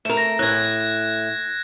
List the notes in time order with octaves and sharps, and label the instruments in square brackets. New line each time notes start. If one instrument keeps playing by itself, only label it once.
[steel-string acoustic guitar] A3 A#4 [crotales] E7
[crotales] A#6
[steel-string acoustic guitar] A2 G#5 [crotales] F#6 G#6